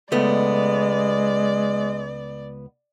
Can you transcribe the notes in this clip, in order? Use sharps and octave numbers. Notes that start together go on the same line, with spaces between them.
C#2 G#3 A3 B3 D5